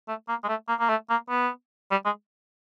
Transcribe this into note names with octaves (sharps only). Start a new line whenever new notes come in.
A3
A#3
G#3
A3
A#3
A#3
A3
A#3
B3
G3
G#3